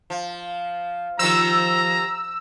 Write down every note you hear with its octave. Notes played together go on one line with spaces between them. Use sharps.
F3
D#3 F3 G3 C4 A#5 E6